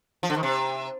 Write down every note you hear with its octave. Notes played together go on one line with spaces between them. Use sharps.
F3
D3
D#3
C3